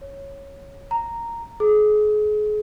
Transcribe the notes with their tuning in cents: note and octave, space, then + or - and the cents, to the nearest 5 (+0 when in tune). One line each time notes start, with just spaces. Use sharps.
C#5 -5
A#5 -5
G#4 +35